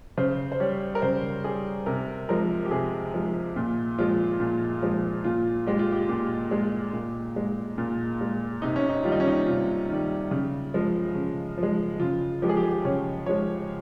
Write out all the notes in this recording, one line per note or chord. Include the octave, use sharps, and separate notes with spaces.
C#3 C5
C5
G3 C#5
A#4
C#3 C5
G3 G#4
C3 A#4
F3 G#3 A#4
G4
C3 G#4
F3 G#3
A#2
F3 G#3 F4
A#2
F3 G#3
A#2 F4
G#3 G4
F4
G4
A#2 G4
G#3
A#2
G#3
A#2
G#3
C3 D#4
C#4
D#4
D#3 G3 F4
D#4
C#4
D#4
C3 F4
D#3 G3
C#3
F3 G#3
C#3
F3
G#3
C#3 F4
F3 G#3 G4
G#4
G4
G#4
G4
C#3 C#5
F3 G#3 C#5